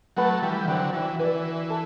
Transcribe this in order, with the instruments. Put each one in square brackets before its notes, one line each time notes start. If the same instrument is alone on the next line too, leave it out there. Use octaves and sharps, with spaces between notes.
[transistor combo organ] F#3 A3 [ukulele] B4 F#5 B5
[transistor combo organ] E3 G3 [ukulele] G4
[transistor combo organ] D3 F#3 [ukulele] C5 G5 B5
[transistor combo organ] E3 [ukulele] F#4
[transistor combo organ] E3 [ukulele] B4 D5
[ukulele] F#4
A4